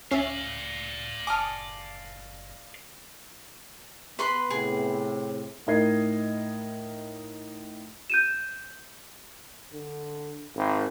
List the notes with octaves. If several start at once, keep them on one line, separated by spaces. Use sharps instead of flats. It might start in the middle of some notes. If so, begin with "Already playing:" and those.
C#2 C#4 D5 E5 F5
F#1 G#5 A5 D6 D#6 F6
B3 B4 B5 C6
A2 C3 G#4
A2 D#4 A#4 D#5 G#6 C7
G6 D#7 E7
D3
G#1